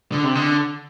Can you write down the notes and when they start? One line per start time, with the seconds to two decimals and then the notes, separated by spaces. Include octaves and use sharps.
0.12 D3
0.24 C3
0.35 D3